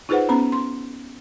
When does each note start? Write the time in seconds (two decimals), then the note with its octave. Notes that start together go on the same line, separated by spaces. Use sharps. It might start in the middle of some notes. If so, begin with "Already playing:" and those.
0.09 D#4 F4 G#4 B4 C5 F#5
0.29 B3 C#4 A#5
0.52 C6